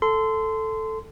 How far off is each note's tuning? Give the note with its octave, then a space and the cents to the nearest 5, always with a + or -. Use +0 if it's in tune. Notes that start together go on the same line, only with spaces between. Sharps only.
A4 +0 C6 -20